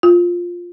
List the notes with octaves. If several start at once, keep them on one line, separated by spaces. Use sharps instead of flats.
F4